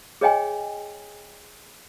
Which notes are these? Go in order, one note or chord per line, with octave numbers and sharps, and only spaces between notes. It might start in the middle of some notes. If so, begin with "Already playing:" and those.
G#4 C#5 D#5 G5 G#5